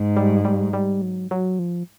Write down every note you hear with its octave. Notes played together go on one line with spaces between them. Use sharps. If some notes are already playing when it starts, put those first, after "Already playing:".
Already playing: G#2
G3
G3
G3
F#3
F#3
F3